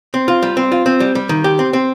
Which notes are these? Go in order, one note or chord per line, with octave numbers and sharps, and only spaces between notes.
C4
F4
G3
C4
F4
C4
G3
G3
D#3
G4
C4
C4